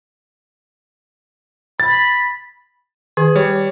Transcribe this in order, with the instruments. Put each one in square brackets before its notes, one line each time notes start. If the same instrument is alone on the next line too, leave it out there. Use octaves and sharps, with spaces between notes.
[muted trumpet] B5 [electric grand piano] A6
[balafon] D#3 [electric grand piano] G#4
[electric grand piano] G3 C#5